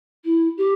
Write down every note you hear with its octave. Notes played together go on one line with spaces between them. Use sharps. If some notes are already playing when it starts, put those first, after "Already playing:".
E4
G4